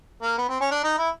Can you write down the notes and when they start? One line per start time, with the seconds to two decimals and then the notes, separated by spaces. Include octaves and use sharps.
0.22 A#3
0.38 B3
0.49 C4
0.60 C#4
0.71 D4
0.84 D#4
0.98 E4